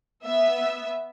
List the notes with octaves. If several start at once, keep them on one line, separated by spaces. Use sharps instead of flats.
B3 E5